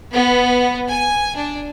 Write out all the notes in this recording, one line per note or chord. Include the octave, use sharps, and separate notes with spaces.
B3
G#5
D4